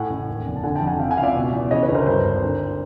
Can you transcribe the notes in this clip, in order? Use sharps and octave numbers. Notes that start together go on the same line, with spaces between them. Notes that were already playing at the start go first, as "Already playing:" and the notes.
Already playing: A2 F#5 G#5
A1
D#2
F1
A5
D3 F#5 G#5
G5 A5
F2
F#5 G#5
C3 F5 G5
F#5 G#5
C#2 F5
D5 E5
B2
E2
C#3 C#5 D#5
B4 C#5
D2
A#4 C5
G2 A#4 C5
G#1
D3